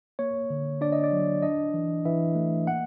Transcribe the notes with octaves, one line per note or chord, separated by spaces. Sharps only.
A#3 C#5
D3
D4 D5
D#5
D5
F#3
D4 D#5
E3
E3 E5
A3
A#3 F#5